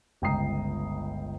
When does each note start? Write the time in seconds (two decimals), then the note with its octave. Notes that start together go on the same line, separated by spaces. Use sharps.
0.22 G1 C#2 G5 A#5 D#6 C7